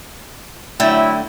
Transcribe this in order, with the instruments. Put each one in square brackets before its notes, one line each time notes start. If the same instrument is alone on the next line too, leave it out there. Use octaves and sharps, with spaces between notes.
[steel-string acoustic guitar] D3 A3 G5 [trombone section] F#3 E4